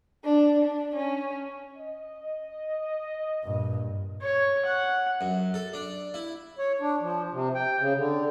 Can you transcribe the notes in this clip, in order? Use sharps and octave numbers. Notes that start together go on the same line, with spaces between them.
D4
D4
C#4
D#5
G2 A#2
C#5
F#5
F#2
A4
D4
E4
C#5
D4
F3
C3
G5
C#3
D3